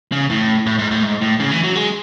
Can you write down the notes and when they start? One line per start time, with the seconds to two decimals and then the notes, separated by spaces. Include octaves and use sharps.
0.12 C#3
0.30 A2
0.66 A2
0.79 G#2
0.91 A2
1.03 G#2
1.22 A2
1.40 C#3
1.51 E3
1.64 F#3
1.75 G#3